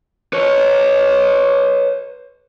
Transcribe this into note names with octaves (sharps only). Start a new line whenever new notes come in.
B4 C#5